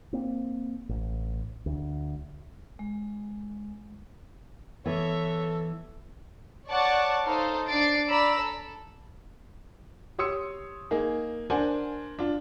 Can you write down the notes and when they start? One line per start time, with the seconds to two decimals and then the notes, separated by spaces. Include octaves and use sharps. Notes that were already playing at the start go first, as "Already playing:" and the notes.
0.13 A#3 C4
0.89 A1
1.66 D2
2.79 G#3
4.86 E3 B3 A4 C#5 E5
6.69 C#5 D5 F#5 A5 C#6 D6
7.25 D#4 A4 C5 F5
7.68 D4 A6 C7 D7
8.08 D5 A#5 B5 E6
8.38 A4
10.19 G4 C#5 C6 D#6 E6 C#7
10.91 A#3 D#4 G#4
11.50 D4 A#4 C5 F#5 G#5
12.19 D4 F4